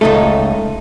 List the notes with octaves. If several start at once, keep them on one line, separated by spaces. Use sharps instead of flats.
C#2 A3 D#4 A4